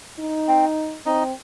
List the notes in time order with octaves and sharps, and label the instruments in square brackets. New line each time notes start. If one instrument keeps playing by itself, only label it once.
[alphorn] D#4
[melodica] C4
[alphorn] C4 [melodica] D#4